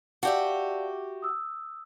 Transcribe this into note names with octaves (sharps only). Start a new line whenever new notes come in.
F#4 G4 D5 E5 F5 A5
D#6 E6